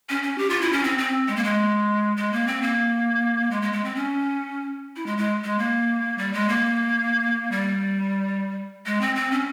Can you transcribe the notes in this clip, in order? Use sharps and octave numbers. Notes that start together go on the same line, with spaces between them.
C#4
C#4
G4
F4
E4
C#4
C4
C4
G#3
A#3
G#3
G#3
A#3
C4
A#3
G#3
G#3
G#3
C4
C#4
E4
G#3
G#3
G#3
A#3
G3
G#3
A#3
G3
G#3
C4
C4
C#4